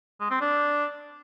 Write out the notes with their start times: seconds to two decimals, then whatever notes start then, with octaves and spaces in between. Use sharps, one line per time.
0.21 G#3
0.31 C4
0.41 D4